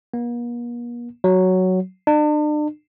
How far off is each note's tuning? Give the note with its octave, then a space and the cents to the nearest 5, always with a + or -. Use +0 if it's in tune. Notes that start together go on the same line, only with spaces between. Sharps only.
A#3 +45
F#3 +5
D4 +40